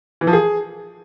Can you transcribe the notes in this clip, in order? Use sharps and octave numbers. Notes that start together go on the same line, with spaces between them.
E3
F3
G#4